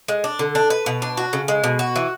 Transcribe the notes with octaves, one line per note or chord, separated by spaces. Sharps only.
G#3
D4
D3
D4
B4
B2
D4
F#4
C#3
G#3
B2
F#4
E3